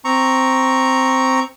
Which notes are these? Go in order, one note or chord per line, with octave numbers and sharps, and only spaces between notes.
C4 A#5 C#6